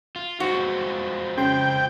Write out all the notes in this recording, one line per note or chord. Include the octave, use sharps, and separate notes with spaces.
F4
G#3 C4 F4 F#4
C#3 G5 C6